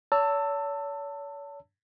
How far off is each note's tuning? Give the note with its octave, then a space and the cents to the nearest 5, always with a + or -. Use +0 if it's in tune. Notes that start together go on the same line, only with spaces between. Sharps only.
C#5 +40 A5 +25 E6 +0